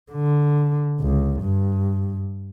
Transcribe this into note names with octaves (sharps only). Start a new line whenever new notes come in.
D3
C#2
G2